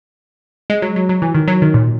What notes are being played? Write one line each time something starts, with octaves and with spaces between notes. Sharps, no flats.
G#3
F#3
F#3
F#3
E3
D#3
F#3
D#3
A#2